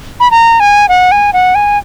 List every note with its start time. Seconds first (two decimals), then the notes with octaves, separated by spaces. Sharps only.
0.20 B5
0.31 A#5
0.60 G#5
0.89 F#5
1.12 G#5
1.33 F#5
1.55 G#5